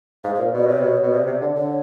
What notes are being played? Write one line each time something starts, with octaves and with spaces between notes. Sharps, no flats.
G#2 F5
C5
A#2
B2 D5
C3 C#5
B2
B2
C3 D5
C3
D3
D3 C#5